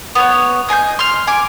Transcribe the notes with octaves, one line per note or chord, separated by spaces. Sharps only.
B3 C#5
D#5 G#5 C6 G6
C6 F6
G#5 D6